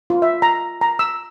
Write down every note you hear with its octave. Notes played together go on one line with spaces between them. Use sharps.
F4
E5
A#5
A#5
E6